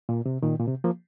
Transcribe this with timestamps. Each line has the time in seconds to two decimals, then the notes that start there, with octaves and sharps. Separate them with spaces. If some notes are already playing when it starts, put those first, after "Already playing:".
0.09 A#2
0.26 C3
0.43 A#2 D#3
0.59 A#2
0.68 C3
0.84 F3 A#3